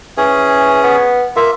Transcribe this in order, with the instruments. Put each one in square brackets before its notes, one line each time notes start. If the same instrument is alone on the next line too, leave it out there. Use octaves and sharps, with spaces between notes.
[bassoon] E3 [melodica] C#4 G#4
[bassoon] B3
[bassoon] A#3 [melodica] F4 E5